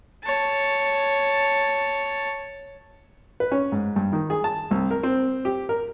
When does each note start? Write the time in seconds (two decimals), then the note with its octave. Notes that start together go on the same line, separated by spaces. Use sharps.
0.24 C#5 A5
3.40 B4
3.52 C#4
3.72 G#2
3.96 G2
4.12 D#3
4.30 G#4
4.44 A5
4.71 C2
4.91 A#4
5.03 C4
5.45 G4
5.69 A#4